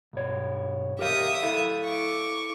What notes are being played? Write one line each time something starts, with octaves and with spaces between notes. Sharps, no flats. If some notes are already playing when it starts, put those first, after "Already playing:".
B1 G2 C#5
G4 A#4 E5 F5 D#6
E4 A4 F5
C#6 D6